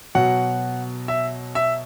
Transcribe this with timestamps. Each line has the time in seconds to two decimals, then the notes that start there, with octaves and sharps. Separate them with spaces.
0.15 B2 F#3 F#5
1.08 E5
1.55 E5